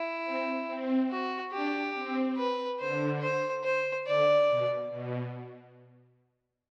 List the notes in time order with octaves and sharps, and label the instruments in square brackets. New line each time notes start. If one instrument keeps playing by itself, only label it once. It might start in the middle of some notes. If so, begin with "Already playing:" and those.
Already playing: [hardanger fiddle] E4
[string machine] C4
C4
[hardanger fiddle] F#4
[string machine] D4 [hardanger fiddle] G4
[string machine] C4
[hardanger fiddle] B4
[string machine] D3 [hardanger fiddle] C5
[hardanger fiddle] C5
C5
[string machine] D3 [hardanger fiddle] D5
[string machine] B2
B2